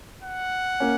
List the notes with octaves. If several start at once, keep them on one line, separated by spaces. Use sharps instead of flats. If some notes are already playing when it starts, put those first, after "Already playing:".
F#5
A#3 C#4